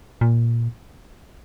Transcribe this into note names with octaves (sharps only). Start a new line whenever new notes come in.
A#2